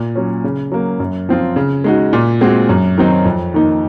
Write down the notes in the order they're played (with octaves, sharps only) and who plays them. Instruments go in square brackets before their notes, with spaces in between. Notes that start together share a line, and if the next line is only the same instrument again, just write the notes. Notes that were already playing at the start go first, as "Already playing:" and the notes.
Already playing: [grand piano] A#2
F#3 C#4
C#3
F#3 A#3
F#2
F3 C4 F4
C#3
G#3 D#4 F#4
A#2
G#3 C4 F#4
F#2
D#3 F#3 C4 D#4
F2
D#3 A#3 D#4